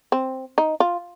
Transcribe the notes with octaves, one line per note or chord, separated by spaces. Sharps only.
C4
D#4
F4